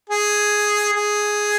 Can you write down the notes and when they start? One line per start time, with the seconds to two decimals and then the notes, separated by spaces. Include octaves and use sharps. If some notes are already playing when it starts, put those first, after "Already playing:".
0.10 G#4
0.93 G#4